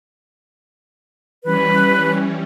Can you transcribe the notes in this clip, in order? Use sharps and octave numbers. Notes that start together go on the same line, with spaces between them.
E3 G3 C#4 B4